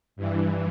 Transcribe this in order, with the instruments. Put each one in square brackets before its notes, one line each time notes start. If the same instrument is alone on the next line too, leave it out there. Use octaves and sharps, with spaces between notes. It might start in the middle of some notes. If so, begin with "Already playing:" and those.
[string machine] G2 E3